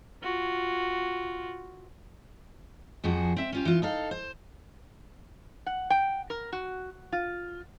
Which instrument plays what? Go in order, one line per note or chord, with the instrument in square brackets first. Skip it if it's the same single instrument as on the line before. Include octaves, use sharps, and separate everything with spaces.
[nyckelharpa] F4 F#4
[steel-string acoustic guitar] F2 F3 F#4 G#4
C4 E5
C#4 F4 G4
E3 F4
D#4 A4 F5
C5
[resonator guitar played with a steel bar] F#5
G5
A#4
F#4
F4